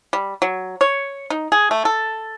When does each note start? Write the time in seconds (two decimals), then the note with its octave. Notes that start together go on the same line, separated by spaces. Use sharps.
0.13 G3
0.42 F#3
0.81 C#5
1.30 D#4
1.52 G#4
1.71 A3
1.85 A4